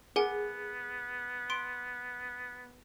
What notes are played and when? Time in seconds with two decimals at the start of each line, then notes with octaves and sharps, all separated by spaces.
0.16 B3 G#4 A#4 F#5 G#5
1.50 C6 D7